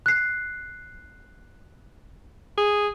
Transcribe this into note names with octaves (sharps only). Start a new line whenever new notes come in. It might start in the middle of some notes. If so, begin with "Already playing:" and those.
F#6 C7
G#4